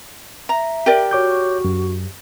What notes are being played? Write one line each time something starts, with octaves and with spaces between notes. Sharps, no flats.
E5 A#5
G4 A#4 D5
F#4 C#5 D6 G6
F#2